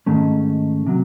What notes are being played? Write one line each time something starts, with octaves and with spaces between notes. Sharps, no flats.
G#2 D#3 A3 C#4
C3 F#3